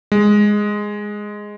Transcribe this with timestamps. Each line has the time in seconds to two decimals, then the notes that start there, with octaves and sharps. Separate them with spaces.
0.12 G#3